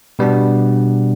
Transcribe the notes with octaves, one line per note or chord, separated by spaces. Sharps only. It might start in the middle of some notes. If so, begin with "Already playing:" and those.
B2 G3 B3 D4